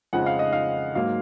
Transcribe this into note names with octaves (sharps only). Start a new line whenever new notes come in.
F2 C#3 F3 G#3 D#4 F#5
F5
D#5
F5
G#2 F#3 A#3 F5